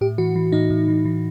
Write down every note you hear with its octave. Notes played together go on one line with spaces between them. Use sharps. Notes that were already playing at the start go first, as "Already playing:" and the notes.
A2 G4
E3 F#4
E3
A2 D#4
A2
E3
E3